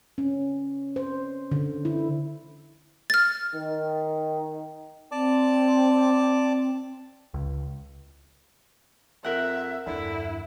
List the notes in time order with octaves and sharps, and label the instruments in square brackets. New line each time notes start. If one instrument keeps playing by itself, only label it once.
[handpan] C#4
C5
D3
E4
[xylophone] F6 A6
[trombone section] D#3
[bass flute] C4 [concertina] D5 A5 D6
[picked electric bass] C#2
[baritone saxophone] F2 [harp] A#4 F#5 [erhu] E5
[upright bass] E2 G2 [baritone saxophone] D3 [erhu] E4